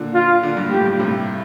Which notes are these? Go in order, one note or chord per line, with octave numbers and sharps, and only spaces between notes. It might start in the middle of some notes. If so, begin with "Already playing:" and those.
Already playing: A#2 D3
F4
A#2 D3
G2 A#2
A2 G4
G2 A#2
A2 C3